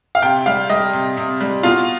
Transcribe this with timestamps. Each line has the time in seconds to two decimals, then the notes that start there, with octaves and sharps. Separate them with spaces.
0.15 F5
0.22 C3 G5
0.46 G3 F5
0.70 G3 D#5
0.93 C3
1.17 C3
1.41 G3
1.63 B2 F4